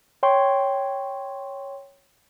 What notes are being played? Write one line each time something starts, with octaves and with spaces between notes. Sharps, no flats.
C#5 G5 C6 C#6